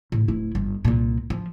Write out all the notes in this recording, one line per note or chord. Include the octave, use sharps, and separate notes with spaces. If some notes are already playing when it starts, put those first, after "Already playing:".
A2
D1 E4
G1
C2 A#2
F3